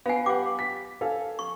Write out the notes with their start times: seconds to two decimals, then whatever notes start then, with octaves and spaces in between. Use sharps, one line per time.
0.06 B3 F5 G#5 C7
0.26 G4 B4 F#5 D6
0.59 B6
1.01 A4 F5 G#5
1.39 C#6